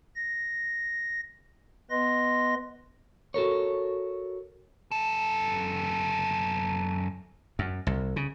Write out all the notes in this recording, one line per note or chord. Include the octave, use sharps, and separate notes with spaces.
A#6
B3 B4 D#5 C6 A#6
F#4 A4 A#4 C#5
F#2 A4
F#2
C2
C#3